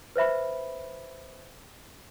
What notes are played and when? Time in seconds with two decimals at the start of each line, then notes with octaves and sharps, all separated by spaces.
0.16 B4 C5 E5 B5